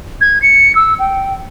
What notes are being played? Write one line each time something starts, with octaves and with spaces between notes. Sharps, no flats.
G#6
C#7
E6
G5